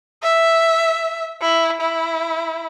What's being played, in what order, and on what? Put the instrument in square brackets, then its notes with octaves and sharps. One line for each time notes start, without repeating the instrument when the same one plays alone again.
[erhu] E5
E4
E4